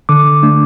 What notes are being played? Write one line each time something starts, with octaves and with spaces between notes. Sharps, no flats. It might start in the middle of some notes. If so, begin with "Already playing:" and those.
D3 D6
A3 D4